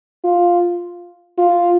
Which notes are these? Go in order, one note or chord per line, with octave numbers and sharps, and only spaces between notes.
F4
F4